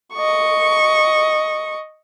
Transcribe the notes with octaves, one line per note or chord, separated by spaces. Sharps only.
D#5 C#6